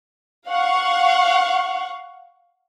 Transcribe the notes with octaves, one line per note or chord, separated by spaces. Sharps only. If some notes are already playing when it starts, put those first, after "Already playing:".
F5 F#5 C#6